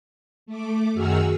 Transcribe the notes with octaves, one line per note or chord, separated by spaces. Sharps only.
A3 D6
F#2 D#3 F#4 G#4 E6 F6